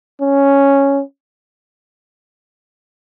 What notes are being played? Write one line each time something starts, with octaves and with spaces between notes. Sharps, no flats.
C#4